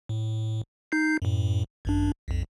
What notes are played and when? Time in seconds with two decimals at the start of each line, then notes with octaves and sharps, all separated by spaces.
0.09 A2
0.92 D#4 G6 C7
1.22 F#2 A2
1.85 G#1 F#2 D4
2.28 B1 F2